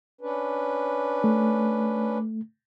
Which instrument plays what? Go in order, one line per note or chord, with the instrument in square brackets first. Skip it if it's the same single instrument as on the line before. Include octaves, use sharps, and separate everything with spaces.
[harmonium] C#4 D4 B4
[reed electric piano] A3